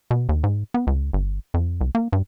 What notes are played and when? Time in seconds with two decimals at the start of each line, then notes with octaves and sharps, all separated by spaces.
0.11 B2
0.29 D#2
0.44 G#2
0.74 B3
0.87 C#2
1.13 G1
1.54 F2
1.81 C2
1.95 A#3
2.13 G2